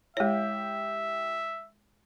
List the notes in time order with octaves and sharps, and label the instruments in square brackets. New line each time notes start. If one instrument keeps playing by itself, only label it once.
[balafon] G#3 C#5 [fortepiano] E4 G4 [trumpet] E5